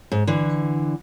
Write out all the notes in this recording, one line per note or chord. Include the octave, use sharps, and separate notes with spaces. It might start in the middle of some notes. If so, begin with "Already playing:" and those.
G#2
D3 E3